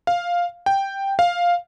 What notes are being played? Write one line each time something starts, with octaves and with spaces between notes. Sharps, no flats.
F5
G5
F5